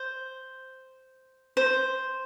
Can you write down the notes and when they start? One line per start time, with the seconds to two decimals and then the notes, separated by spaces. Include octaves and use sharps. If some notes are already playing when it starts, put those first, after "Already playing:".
Already playing: C5
1.57 C5